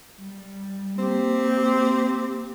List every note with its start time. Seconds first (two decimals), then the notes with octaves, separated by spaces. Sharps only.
0.19 G3
0.99 A#3 C4 G4